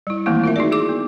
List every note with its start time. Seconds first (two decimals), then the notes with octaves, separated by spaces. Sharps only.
0.07 G3 E4
0.26 D#3 E3 A3 A#3 C4 E4
0.44 F4 A#4 E5
0.56 D#4 F#4 G#4 D5
0.72 E4 G#4 D6
0.89 B3